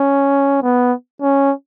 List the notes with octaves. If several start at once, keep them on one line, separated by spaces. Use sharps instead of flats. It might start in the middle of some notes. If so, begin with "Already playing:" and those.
Already playing: C#4
B3
C#4